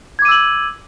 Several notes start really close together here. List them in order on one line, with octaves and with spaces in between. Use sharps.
G#6 D6 D#7 E6 F#7